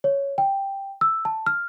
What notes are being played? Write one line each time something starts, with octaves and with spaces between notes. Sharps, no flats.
C#5
G5
E6
A5
F6